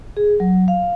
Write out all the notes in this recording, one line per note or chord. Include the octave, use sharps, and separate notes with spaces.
G#4
F#3
F5